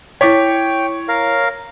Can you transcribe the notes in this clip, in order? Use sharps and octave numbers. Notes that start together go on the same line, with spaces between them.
E4 C#5 G5 D6 B6
A#4 F5